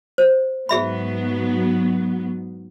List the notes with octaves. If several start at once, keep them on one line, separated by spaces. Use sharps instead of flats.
C5
G#2 F#3 B3 G#4 E5 B5